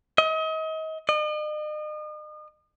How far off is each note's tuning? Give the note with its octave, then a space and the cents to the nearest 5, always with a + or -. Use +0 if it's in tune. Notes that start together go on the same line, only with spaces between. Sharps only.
D#5 +35
D#5 -40